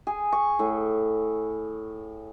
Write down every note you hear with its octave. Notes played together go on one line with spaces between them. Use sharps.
G#4
C#6
A2